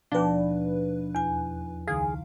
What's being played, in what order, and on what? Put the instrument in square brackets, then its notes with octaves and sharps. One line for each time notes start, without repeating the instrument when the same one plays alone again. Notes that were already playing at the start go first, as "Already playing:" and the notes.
[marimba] D#2 F3 [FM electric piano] B2 B4 [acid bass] D4
[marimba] E2 G#5
[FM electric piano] C#2 D#3 F5 [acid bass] G#4